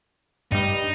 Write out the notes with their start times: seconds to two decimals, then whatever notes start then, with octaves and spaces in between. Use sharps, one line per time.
0.52 G2 G3 D#4